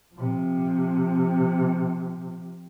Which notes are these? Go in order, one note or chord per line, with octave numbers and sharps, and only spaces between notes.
C3 F3